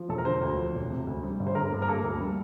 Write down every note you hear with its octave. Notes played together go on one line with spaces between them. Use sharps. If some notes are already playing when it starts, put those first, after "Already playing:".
Already playing: F3
E1 A4
A#4
D3 C5
D2
F3
E1
C3
D2
G3
G1
C5
D3 A#4
G2
A#4
A#3 A4
D2
G3